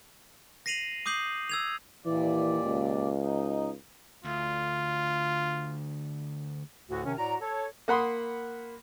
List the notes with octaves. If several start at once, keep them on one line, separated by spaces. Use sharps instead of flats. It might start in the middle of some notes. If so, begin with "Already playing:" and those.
A#6 C7 D#7 F7 F#7
D6 D#6 G6 C7 F#7
E6 G#6 F7
D#2 A#2 E3 D5
C#2
D#4
D2 F4
D2 A2 D3 F#4
C3 D#3 C#4
A2 F#4 D5 A#5
A4 C#5
A#3 F#5 B5 C6 D#6